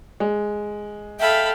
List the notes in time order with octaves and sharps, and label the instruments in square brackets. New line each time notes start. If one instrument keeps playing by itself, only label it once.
[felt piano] G#3
[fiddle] A4 B5 [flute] E5 [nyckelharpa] F5 G5